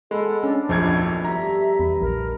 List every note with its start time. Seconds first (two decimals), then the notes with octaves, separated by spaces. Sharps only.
0.11 G#3 B3 A4 B4 D#5
0.44 C#4 D4
0.69 F1 A#1 D#3 F3 F#3 A3 G#6
1.24 G2 E5 A#5 C6
1.80 E2 B4
2.02 A#1 A#4